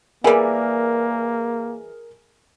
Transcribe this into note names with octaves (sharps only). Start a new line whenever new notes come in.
E3 G3 A#3 G#4 A#4 G#5